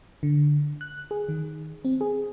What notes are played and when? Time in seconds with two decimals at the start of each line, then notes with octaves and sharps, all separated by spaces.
0.23 D3
0.81 F#6
1.11 G#4
1.29 D#3
1.85 C4
2.01 G#4